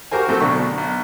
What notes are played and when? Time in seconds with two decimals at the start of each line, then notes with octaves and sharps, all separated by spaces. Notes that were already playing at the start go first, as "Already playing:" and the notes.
0.12 F#4 G4 A#4 C5 G#5
0.28 A2 F#3 A3 C4
0.40 B1 B2 D3 C#6
0.78 B1